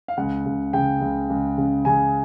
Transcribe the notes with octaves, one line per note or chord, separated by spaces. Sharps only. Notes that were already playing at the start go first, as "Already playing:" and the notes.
F5
C#2 F#5
C#2
C#3 G5
C#2
C#2
C#3
C#3 G#5